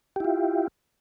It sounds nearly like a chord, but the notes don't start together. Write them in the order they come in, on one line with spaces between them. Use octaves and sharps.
G4 E4 F4